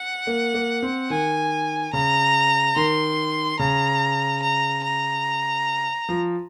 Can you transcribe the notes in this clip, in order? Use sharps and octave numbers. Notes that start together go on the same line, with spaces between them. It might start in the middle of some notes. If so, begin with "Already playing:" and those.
Already playing: F#5
A#3
A#3
C4
D#3 G#5
C#3 A#5
D#3 C6
C#3 A#5
A#5
A#5
F3